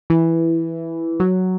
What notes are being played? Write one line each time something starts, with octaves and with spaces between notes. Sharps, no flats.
E3
F#3